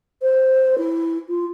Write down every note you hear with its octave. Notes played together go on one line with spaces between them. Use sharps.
C5
E4
F4